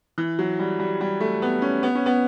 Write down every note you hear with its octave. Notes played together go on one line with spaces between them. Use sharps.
E3
F#3
G3
G3
G3
A3
B3
C#4
B3
C#4
B3